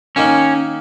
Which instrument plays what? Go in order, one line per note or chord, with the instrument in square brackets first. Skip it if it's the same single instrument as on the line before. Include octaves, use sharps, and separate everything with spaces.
[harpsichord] D#3 A#3 D#4 [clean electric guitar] C#4